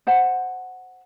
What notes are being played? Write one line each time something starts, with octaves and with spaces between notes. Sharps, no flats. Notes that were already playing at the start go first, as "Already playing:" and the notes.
C5 F#5 A5